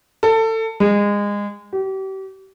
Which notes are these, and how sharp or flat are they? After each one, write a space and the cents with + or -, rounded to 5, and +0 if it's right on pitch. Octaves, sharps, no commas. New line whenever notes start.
A4 +25
G#3 -25
G4 -35